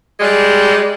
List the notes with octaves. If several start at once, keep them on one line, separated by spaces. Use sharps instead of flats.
G3 G#3